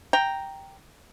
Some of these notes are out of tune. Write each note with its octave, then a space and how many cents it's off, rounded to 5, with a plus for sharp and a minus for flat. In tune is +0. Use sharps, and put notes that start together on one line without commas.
G5 +0 A#5 +0